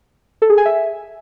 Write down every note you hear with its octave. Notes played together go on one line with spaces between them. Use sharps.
A4
G#4
G#5
E5